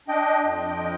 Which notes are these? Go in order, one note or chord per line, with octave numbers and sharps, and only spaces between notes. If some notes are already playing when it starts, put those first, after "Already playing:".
D4 D#5 G5
F2
F3